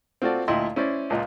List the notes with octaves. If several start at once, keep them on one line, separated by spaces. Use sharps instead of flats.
C4 F4 F#4 A4 D5
D2 A#2 E4 D#5 G5 C6
C#4 E4 C5 D5
C#2 A#2 D#5